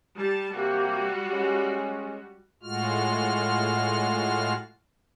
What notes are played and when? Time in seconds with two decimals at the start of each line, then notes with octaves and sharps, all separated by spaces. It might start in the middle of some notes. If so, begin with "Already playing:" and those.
0.17 G3 A5
0.53 C3 G3 A#3 F#4 G4
1.30 G#3 C#4
2.63 A2 G#3 F4 F#4 F6